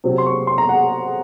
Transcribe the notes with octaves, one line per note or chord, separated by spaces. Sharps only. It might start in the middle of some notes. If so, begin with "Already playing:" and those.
C3 F#3 C4
C6
C#6
C6
A#5
F#5